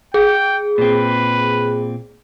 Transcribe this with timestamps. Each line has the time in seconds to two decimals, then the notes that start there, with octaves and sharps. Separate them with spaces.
0.14 G#4 G5
0.78 A#2 C4 B4